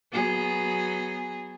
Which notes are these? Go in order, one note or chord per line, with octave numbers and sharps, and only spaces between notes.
F#3 B3 G#4